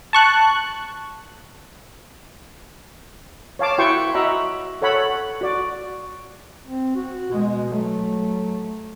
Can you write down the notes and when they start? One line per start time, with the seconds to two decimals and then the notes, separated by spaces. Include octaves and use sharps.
0.13 A5 C#6 F#6
3.59 C#5 F5 A5 D6
3.78 E4 F#4 B4 G5 C6 C#6
4.14 F#4 D#5 E5 A#5 B5
4.82 A4 C#5 F#5 B5
5.41 F#4 D5
6.66 C4
6.96 F#4
7.31 B2 G#3
7.70 F#3 A3